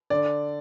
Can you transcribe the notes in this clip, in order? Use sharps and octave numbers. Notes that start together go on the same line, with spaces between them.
D3 D5